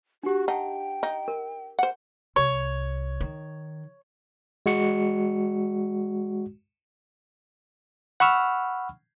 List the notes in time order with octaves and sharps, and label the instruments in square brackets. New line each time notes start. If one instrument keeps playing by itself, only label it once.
[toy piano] D4 G4 [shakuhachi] F#4
[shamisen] D#4 [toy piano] F#5 A5 [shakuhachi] G5
[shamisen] D#4
[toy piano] A#4
[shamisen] C5 F#5
[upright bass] C2 [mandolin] C#5
[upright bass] D#3
[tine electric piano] G#3 F#4 C#7
[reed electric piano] F#5 B5 C#6 E6 F6